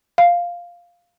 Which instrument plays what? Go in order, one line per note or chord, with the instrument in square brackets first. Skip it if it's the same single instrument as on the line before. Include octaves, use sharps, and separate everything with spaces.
[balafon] F5